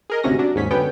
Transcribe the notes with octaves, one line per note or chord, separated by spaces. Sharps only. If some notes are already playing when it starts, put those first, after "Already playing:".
G#4 A#4 D#5
G#1 D2 C3 F#3 C#4 A#6
F#3 D4
D#2 G#2 C#4 B6
F#2 D3 B3 C#4 G5